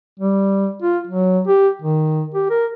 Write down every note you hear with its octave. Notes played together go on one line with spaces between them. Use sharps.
G3
F4
F#3
G4
D#3
G4
A#4